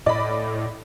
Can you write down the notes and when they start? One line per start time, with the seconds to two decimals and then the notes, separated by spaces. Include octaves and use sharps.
0.06 A2 D5 D#5 B5